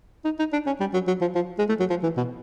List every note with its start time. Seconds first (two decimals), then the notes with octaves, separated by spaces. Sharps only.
0.25 D#4
0.39 D#4
0.53 D4
0.66 C#4
0.80 G3
0.94 F#3
1.07 F#3
1.21 F3
1.35 F3
1.59 G#3
1.69 A3
1.79 F#3
1.90 F3
2.03 E3
2.17 B2